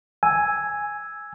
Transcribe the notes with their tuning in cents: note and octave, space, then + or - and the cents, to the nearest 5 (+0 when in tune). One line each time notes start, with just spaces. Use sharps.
G#5 +0 E6 +0